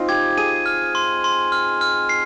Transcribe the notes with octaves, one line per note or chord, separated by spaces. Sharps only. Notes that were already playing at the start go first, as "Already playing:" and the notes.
Already playing: C4 D#4 F4
G4 G#6
G#4 D#7
F6
C6
C6
F6
F6
C7